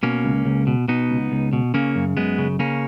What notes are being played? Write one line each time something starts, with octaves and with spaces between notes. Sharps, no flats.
B2 A#3 C#4
C#2
C#2
B2
B2 B3 D#4
C#2
C#2
B2
C#3 A#3 C#4
F#2
F#2 G#3 B3
C#3
C#3 A#3 C#4